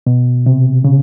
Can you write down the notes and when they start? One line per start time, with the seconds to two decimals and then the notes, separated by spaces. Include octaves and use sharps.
0.07 B2
0.46 C3
0.84 C#3